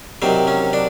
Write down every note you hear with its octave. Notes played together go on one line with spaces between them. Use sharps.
C2 C3 D#3 F#3 C4
C#4
D4